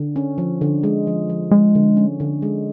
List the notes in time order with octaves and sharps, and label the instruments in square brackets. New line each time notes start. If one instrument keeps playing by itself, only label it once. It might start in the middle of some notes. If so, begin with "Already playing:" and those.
Already playing: [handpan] D3
C#4
F3
D3
G#3
F3
F3
[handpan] F3 [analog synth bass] G#3
[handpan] D3
C#4
D3
G#3